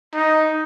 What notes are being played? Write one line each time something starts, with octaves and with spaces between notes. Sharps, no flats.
D#4